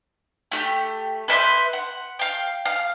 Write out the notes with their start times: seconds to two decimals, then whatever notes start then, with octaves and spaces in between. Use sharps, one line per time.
0.52 A3 F#4 G4
1.28 B4 E5 C6 G6
1.73 F#5
2.19 F5 G5
2.65 F5 F6